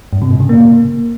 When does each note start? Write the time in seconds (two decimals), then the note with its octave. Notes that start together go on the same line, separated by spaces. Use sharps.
0.13 G2
0.22 C3
0.31 A2
0.40 C#3
0.49 A#3